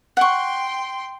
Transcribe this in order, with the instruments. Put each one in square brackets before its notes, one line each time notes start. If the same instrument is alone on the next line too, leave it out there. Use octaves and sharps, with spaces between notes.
[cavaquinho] F#5 C#6 [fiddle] G5 C6